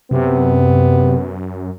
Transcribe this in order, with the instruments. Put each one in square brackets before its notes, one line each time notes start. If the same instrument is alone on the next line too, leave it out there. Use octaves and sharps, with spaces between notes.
[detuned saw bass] F#2 [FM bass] C3 [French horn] B3